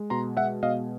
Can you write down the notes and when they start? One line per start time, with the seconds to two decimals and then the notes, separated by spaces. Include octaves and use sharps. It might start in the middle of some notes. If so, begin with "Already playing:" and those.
Already playing: G#3
0.10 B2 A#5 C6
0.37 G#3 E5 F#5
0.63 B2 D#5 F5